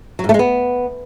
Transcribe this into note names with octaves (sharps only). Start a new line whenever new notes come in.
F#3
G#2
A3
G#3
B3